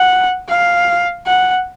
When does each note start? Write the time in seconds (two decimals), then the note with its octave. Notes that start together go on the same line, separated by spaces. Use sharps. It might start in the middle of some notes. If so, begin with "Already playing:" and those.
Already playing: F#5
0.49 F5
1.26 F#5